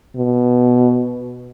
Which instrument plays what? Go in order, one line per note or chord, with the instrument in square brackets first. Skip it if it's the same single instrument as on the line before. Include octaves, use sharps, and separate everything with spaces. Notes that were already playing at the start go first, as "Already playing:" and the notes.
[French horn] B2